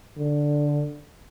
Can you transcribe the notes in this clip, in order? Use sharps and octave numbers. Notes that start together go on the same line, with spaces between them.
D3